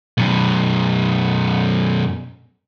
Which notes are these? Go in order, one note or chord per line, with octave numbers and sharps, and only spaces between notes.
F#2 B2